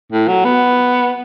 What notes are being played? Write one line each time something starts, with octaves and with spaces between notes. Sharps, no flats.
A2
F#3
B3